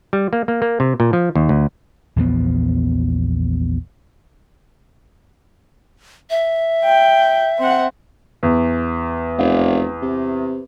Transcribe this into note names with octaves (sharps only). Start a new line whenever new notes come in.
G3
A#3
A#3
A#3
C3
A#2
F3
D#2
D2
A#1 E2 F3 B3
E5
G5
C4 F#5
E2
F1
C3